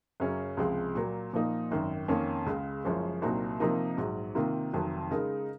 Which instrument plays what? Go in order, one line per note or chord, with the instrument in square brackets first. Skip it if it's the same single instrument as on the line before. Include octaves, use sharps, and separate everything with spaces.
[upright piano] F#2 C#3 F#3 C#4
C#2 C3 F3 G#3
A#2 F#3 A#3
A#2 F3 A#3 D#4
G#1 F#2 D#3
F2 D#3 A#3 C#4
C#2 C#3 G#3
F#1 F#2 F3 G#3 C#4
C2 A#2 F#3 C4 D#4
C3 F3 A#3 D#4 A#4
A#1 G#2 F#3
C3 D#3 A#3 F4
F1 F2 D#3 F#3
C#3 G#3 D#4 A#4